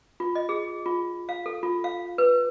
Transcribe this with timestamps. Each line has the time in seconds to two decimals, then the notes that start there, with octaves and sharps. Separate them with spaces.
0.20 F4
0.35 D#5
0.49 G#4
0.86 F4
1.29 F5
1.46 A4
1.63 F4
1.84 F5
2.18 B4